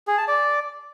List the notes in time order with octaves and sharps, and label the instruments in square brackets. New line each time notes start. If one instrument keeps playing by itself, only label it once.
[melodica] G#4
A5
D5